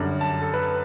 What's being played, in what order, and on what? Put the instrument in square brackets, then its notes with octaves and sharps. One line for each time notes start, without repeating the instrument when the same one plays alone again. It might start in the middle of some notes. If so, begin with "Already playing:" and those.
Already playing: [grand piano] F#2 D3 G3
A5
A4
B4